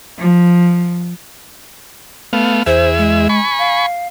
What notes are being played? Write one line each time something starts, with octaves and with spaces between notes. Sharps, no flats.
F3
A3 B3 F5
E2 G#4 C5 E5
G#3
G#5 B5 C#6
F5